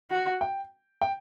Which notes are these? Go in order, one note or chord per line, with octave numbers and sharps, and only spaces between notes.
F#4
G5
G5